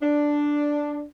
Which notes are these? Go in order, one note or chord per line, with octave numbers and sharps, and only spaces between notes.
D4